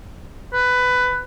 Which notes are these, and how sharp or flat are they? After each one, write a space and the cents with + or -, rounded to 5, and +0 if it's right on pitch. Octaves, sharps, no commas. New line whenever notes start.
B4 +15